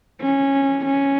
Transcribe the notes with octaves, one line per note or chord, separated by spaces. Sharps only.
C#4
C#4